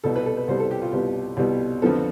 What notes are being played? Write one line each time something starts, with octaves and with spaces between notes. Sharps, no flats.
C2 B2 G3 B3 A4
B4
A4
B4
C2 B2 G3 B3 C5
A4
G4
F4
C2 B2 G3 B3
C2 B2 G3 B3
F2 D3 F3 B3 A4